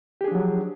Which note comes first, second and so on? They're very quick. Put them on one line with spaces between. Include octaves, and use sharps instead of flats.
G4 G#4 D4 F3 F#3